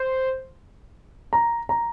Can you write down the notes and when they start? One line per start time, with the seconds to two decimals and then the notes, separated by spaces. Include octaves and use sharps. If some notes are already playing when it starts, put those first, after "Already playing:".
Already playing: C5
1.33 A#5
1.69 A#5